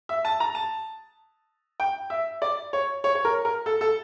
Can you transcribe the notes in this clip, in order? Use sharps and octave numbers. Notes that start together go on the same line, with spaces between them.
E5
A5
A#5
A5
G5
E5
D5
C#5
C#5
C#5
A#4
A#4
A4
A4